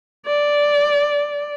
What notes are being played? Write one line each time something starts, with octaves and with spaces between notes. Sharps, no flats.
D5